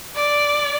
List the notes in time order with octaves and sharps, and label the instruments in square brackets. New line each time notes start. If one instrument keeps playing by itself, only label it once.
[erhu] D5